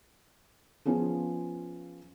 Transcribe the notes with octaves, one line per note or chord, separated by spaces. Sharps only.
F3 B3 C#4 F4 G#4